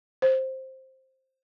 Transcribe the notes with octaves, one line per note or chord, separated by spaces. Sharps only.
C5